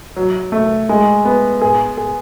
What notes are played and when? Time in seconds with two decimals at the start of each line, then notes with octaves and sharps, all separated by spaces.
0.16 F#3
0.52 A3
0.89 G#3
1.25 B3
1.62 G#4
1.97 G#4